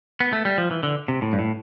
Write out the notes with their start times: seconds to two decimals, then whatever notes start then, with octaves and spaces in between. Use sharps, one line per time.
0.20 B3
0.33 A3
0.45 G3
0.58 F3
0.71 E3
0.83 D3
1.08 C3
1.22 A2
1.33 G2
1.39 A2